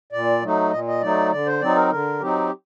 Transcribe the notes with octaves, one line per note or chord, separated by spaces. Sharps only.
A#2 D5
F#3 A3 D#4
A#2 D#5
D#5
F#3 A3 D#4 D5
D3 D5
C5
F#3 C4 D#4 D5
A#4
D3 A#4
F#3 C4 D#4 G4